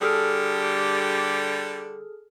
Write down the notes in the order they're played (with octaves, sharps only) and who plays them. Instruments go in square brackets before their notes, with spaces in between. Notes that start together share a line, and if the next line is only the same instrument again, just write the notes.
[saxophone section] D3 G3 [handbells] G#4 A4 F6